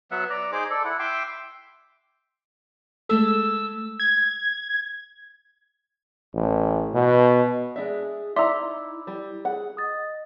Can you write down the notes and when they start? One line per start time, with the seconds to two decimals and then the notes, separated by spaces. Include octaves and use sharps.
0.11 F#3 B3 E5 F#5
0.30 D5 A#5
0.52 D#4 G#4 C5 D6
0.70 A4 D5
0.84 E4 F#5
0.99 E5 G5 C6 D6
3.09 G#3 A3 A4 E6
4.00 G#6
6.34 A1
6.94 B2
7.76 G#3 D4 G#4 E5
8.36 D#4 E4 D5 E5 A#5 C6 D6 E6
9.07 G3
9.45 G#4 F#5
9.77 D#5 D#6 A6